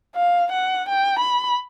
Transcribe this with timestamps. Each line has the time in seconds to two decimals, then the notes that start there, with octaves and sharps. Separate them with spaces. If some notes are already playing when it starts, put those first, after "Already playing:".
0.15 F5
0.52 F#5
0.89 G5
1.19 B5